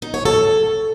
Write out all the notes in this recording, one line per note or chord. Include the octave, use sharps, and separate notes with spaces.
D#4
C#5
A4